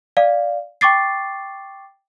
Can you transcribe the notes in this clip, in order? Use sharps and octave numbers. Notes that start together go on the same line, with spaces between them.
D5 F5
G5 C#6 D6 A6 C7